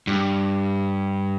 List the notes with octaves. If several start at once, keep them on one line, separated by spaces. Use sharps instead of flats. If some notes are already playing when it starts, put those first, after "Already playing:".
G2